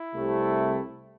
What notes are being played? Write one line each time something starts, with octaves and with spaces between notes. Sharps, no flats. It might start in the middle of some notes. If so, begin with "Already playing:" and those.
Already playing: E4
C2 C3 A3